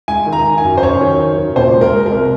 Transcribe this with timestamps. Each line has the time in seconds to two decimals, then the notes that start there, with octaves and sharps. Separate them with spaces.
0.08 G#3 G#5
0.26 D#3
0.32 A#5
0.46 D#3
0.58 G#5
0.64 F#2
0.78 C5
0.83 F#2 C#5
1.01 D#3
1.19 D#3
1.38 F#2
1.56 A#2 C5
1.75 G#3
1.81 A#4
1.94 G#3
2.06 A#4
2.12 C2